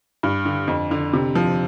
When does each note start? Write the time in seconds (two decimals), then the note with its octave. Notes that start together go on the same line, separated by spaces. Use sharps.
0.23 G2
0.45 D3
0.68 F2
0.91 D3
1.13 C3
1.35 F3